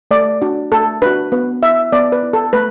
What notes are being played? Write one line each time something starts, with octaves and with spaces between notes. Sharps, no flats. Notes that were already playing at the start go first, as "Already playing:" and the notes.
A3 D5
D4 F#4
A3 A4
D4 F#4 B4
B3 B4
E4 E5
B3 D5
B4
E4
A4
A3 B4